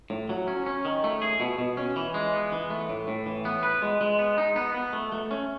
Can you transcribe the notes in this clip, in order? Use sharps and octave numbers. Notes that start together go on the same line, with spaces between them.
A2
F#3
C#4
C#4
D#3
A3
G#4
B2
B2
C#4
E3
G#3
B3
E3
A3
A2
A2
E3
B3
B4
G#3
G#3
B3
D#4
B3
B3
A3
A3
C#4